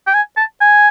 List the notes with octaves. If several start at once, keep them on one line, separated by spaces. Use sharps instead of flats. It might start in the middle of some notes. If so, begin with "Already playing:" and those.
G5
G#5
A5
G#5